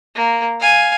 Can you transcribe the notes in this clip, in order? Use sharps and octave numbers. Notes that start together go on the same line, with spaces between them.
A#3
F5 G#5